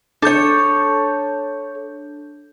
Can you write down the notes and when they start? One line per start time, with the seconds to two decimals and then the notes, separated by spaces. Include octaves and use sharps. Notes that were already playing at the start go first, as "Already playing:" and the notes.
0.22 D4 A4 C#5 G6